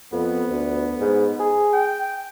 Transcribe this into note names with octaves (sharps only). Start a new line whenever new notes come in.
F2 B3
D2
G#2
G#4
G5